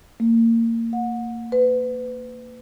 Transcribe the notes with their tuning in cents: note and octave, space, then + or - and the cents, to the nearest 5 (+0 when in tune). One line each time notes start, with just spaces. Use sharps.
A#3 -25
F#5 -30
B4 +30